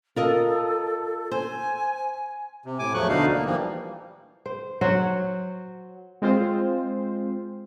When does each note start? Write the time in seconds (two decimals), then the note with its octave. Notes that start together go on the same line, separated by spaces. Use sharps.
0.16 F4 A4 A#4 D#5
1.31 C5 G#5
2.66 C3
2.79 A2 G#5 D6
2.94 E2 F3 F#3 A3 C#6 F#6
3.09 D2 B2 D3 D4 D#4 F5
3.33 A#3
3.46 E3 F3 G3 A#3
4.46 C5
4.81 F#3 F#4 C5 C#5
6.22 G#3 C4 F4 C5